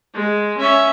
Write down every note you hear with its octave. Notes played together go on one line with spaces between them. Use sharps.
G#3
C#4 E5